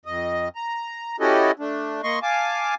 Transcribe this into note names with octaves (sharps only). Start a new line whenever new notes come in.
F2 D#5
A#5
C#4 E4 F#4 G4 A4 D#5
A3 D4
A#3 D#5 C6 C#6
F5 G#5 A5 D6